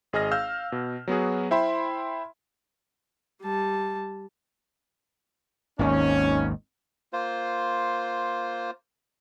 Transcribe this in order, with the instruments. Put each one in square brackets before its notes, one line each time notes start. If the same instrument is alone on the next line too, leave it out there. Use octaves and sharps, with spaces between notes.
[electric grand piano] G#1 G#4 D#5 F6 A#6
F5 E6 F6 G6
B2
F#3 B3 F#4 G#4
E4 C5 E5 G5 B5 C6
[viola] G3 A5
[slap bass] G#1 D#2 D#3 [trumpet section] C#4
[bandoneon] A#3 F4 C5